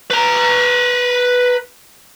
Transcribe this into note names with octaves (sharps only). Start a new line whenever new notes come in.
B4 A#5